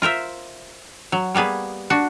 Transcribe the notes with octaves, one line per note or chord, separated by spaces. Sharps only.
F4 A#4 C5 E5
F#3
G3 A#3 B3 G#4
D4 F#4